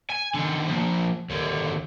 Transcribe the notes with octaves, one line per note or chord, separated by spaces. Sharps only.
G#5
D3 D#3
F3 A#3
D#2 D3